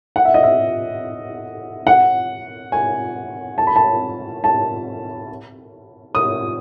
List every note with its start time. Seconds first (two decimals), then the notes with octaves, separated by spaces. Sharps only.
0.16 F#5
0.25 E5
0.34 D#5
0.43 E5
1.87 F#5
2.72 G#5
3.58 A5
3.67 B5
3.76 A5
4.44 A5
6.15 D#6